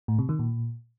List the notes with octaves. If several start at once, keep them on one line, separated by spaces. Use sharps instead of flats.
A2
C3
D#3
A#2